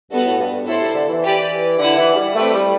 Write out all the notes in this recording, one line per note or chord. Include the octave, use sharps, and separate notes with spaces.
G2 B3 F#4 A4
A2
G2
G2
A2 E4 A4 C5
C3
D3
E3
G4 B4 D5
D3 E4 B4 F#5
E3
G3
A3 C4 E4 G4 B4
G3